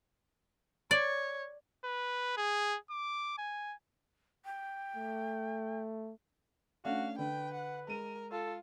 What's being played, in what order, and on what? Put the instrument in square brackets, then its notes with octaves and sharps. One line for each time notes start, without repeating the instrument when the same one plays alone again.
[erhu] C#5 [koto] D5
[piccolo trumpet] B4
G#4
D6
G#5
[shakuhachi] G5
[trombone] A3
[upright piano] A3 C#4 D4 [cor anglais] F#4 [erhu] F5
[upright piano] D3 [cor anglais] B4 [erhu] G5
[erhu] F#5
[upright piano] G#3 D#7 [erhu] A#4
[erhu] F4 [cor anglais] A4